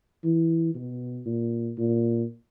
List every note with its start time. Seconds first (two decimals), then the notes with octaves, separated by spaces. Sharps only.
0.24 E3
0.75 B2
1.26 A#2
1.78 A#2